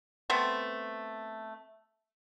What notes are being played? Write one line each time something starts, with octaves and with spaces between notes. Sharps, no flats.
A3 B3 C4